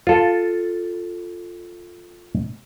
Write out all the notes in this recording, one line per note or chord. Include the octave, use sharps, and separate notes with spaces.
F4 A4